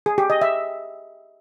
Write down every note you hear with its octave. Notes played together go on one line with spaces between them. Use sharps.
G#4
G4
D#5
E5